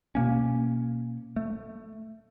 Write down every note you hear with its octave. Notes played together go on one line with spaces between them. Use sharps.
B2 A#3 C#4
A3